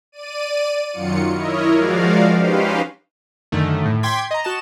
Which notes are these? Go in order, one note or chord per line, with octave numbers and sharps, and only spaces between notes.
D5 D#7
F#2 D#3 F#3 F4 C#7
E4 A#4 C#5 D#5
F3 G#3 F#4 A#4 D5 F5
C#4 D#4 G4 B4 C5 F5
F#2 D3 D#3 A3
A2
G5 C6 D6 G#6 B6
D#5 A#5
F#4 D#5 A5 E7